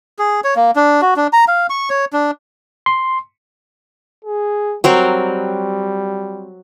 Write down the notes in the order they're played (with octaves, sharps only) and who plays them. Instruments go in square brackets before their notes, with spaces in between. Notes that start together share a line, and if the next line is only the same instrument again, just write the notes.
[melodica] G#4
C#5
A#3
D4
F#4
D4
A#5
F5
C#6
C#5
D4
[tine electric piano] C6
[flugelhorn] G#4
[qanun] F#3 C4 A#4 [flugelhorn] G3